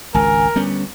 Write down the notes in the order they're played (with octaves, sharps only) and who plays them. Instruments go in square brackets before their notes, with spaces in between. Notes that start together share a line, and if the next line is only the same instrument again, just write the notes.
[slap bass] G#1 C#2 [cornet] A#4 [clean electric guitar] G#5
[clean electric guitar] D2 [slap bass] G3 B3 C#4